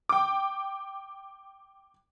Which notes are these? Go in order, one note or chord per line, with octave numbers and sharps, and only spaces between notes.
G5 D6